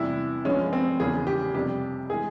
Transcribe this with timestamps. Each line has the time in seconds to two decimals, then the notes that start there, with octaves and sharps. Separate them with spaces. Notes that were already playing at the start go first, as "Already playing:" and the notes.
Already playing: E2 C3 G3 E4
0.45 G1 G2 F3 G#3 C#4
0.73 C4
1.00 E1 E2 C#3 G#4
1.27 G4
1.54 F2 C3 G3 G4
2.10 E3 G#3 G#4